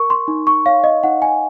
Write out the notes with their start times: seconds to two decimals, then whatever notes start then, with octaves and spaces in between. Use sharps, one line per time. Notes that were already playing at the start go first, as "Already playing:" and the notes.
Already playing: A#4 C#6
0.10 C6
0.28 D#4
0.47 C#6
0.66 C#5 F5
0.84 D#5
1.03 D#4 F#5
1.22 G#5